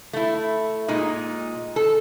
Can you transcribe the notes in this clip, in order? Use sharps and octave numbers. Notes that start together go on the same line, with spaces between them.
A3 E4
A#2 G#3 D#4
A4